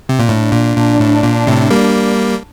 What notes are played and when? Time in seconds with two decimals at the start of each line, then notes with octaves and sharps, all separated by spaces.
0.09 C3
0.19 A#2
0.29 A2 D4
0.53 A#2
0.77 A#2
1.00 A2
1.24 A#2
1.47 A2 C3
1.70 G3 A#3